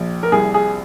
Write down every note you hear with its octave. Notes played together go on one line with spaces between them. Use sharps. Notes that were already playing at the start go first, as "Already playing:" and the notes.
Already playing: A#1
A#4
C2 G#4
G#4